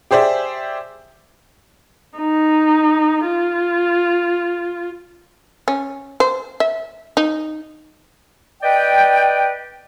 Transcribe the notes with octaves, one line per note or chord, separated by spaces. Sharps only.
G4 G#4 C5 D5 E5
D#4
F4
C#4
C5
E5
D#4
B4 D5 D#5 G5